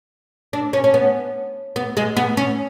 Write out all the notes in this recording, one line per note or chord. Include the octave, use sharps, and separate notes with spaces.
D4
C#4
C#4
B3
B3
G#3
B3
C#4